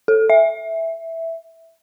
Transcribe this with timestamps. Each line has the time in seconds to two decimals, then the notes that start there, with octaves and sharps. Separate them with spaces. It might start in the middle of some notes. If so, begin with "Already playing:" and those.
0.08 A4
0.30 E5